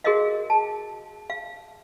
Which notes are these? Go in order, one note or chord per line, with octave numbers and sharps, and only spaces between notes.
F#4 G#4 A#4 C#5 D#5 F5
A5
F5